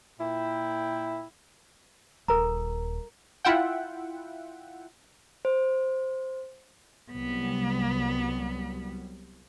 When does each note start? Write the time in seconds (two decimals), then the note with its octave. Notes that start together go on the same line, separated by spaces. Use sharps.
0.20 A#2 E4 G5
2.28 D#1 A4 A#4 A#5
3.45 E4 F4 E5 F#5 G5
5.45 C5
7.12 C2 F#3 G3 B3